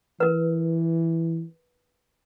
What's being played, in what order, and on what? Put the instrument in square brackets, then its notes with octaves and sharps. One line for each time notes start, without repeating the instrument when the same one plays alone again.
[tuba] E3 [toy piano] A#4 B4